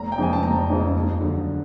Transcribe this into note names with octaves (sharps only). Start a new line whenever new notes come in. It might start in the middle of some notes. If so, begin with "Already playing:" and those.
Already playing: F1 A#5
G5
F2 C#3 F3 G#3 G#5
A5
F1 A#5
F2 C#3 F3 G#3
D#2
D3 F#3